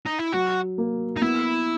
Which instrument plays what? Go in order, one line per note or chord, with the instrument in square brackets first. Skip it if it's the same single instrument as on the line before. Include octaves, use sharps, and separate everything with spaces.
[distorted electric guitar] D#4
E4
[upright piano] F#3 [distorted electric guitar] F#4
[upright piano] A#3
[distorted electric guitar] D#4
[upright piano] B3 [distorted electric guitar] E4